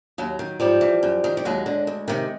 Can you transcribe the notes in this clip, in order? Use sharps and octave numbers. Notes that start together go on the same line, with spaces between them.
D#2 F#3
D#3
G#2 F3 G3
E3
F#2
D#3
G3
D#2 F#3 G#3
D3
D2
C3 D#3